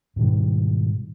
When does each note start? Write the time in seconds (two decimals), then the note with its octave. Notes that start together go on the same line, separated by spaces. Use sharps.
0.16 G#2 B2 D#3 G3